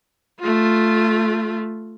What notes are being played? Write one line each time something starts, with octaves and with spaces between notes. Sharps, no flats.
A3 F4